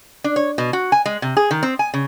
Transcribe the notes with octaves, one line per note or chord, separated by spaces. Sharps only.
D4
C#5
B2
F#4
G#5
G#3
C3
G#4
D#3
C4
G#5
C#3